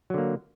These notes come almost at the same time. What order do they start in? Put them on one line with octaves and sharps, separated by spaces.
F#3 D3 A#3